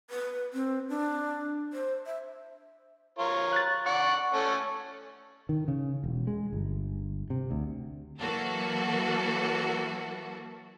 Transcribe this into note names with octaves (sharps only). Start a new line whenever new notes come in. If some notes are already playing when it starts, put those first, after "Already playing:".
B4
C4
D4
C5
E5
F4 A#4 C#5
F#6 A6
D5 F#5 C#6
A3 C#4 A4
D#3
C#3
E1
G#3
G1
C3
D2
E3 F#3 A#3 F#4 A4